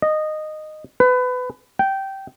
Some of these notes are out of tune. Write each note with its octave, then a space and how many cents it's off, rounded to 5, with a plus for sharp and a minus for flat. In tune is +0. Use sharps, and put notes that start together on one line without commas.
D#5 -15
B4 +25
G5 -15